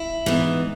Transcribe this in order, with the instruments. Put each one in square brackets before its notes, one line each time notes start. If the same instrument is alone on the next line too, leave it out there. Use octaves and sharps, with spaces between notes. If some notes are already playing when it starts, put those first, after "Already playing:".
Already playing: [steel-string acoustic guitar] E4
G#2 E3 B3